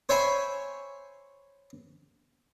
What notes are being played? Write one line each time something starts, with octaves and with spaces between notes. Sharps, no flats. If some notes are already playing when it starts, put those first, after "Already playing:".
C5 C#5 E5 G5 G#5 B5